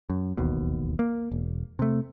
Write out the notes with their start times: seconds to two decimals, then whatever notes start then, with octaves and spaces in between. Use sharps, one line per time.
0.10 F#2
0.37 D1 A1 D#2 B2
0.99 A#3
1.32 E1
1.79 C3 A3